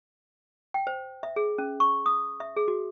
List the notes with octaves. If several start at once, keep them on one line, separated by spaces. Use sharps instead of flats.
G5
C5
E5
G#4
C#4
C#6
D#6
E5
G#4
F#4